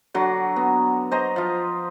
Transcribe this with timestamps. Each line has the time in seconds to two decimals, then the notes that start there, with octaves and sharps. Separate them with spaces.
0.14 D3 F#3 F#4
0.56 B3
1.11 C5 D#5 A#5
1.36 F3 F4